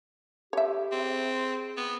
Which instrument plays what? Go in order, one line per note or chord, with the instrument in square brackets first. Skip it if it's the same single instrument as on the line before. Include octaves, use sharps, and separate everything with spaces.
[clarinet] G4 [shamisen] C#5 E5
[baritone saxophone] C4 [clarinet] G#4
[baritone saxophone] B3